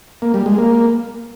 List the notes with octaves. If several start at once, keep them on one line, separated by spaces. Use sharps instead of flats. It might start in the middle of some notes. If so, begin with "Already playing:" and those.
A#3
G3
G#3
A#3